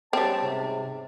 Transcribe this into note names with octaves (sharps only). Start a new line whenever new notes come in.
G3 C4 C#4 A5
G#2 C3